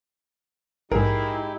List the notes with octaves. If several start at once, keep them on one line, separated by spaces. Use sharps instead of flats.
A#1 G#2 G#3 D#4 E4 G4 G#4 A#4